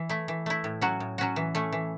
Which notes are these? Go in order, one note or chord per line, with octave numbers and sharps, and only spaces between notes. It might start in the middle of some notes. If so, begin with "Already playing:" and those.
Already playing: E3
A3 E4
E3
A3 E4
A2
F#3 C#4 F#4
A2
F#3 C#4 F#4
E3
A3 C#4
E3